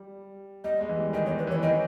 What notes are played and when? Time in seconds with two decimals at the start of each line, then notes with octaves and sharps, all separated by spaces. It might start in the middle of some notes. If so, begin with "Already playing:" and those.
Already playing: G3
0.64 G3 D#5
0.81 G#3
0.89 E3
0.97 G3
1.13 D#3 D#5
1.26 C#5
1.30 G3
1.39 B4
1.47 E3
1.51 C#5
1.62 D#3 D#5